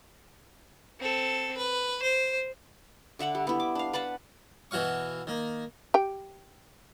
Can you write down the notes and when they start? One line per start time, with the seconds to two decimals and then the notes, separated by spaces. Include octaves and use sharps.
1.00 C4 A4
1.57 B4
2.02 C5
3.19 D3 E5 F#5 B5
3.35 G3
3.47 B3 E4
3.60 D6
3.75 D4 F5
3.93 B4 F#5 A5 B5
4.71 B2 E3 F#4 F5 C#6
5.27 D#3 A#3
5.94 G4 G5